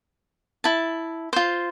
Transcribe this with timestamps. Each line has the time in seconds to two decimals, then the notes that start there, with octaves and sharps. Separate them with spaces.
0.64 E4 A5
1.33 F4 C5